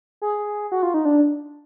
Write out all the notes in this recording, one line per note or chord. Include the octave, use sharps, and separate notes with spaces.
G#4
F#4
F4
D#4
D4